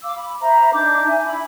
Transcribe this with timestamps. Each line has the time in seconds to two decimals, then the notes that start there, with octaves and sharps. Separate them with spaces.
0.03 F5 D6 E6
0.15 B5
0.41 C5 E5 A#5 B5
0.73 D4 D#4 D6 G6
1.06 E5 G#5
1.23 E4 B5